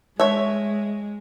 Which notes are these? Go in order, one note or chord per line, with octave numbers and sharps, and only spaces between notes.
G#3 C#5 E5